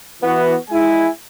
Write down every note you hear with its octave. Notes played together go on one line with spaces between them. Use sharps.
E3 B3 F#4
G#3 E4 G#5